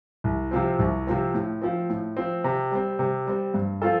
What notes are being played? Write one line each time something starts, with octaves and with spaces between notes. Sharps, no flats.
C2
C3 F3 C4
C2
C3 F3 C4
A2
F3 C4
A2
F3 C4
C3
G3 C4
C3
G3 C4
G2
F3 C4 F4 A4